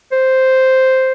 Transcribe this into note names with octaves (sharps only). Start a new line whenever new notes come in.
C5